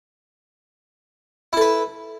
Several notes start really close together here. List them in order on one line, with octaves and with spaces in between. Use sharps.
E4 A4 B4